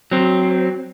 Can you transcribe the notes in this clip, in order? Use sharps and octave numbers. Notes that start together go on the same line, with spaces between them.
F#3 C4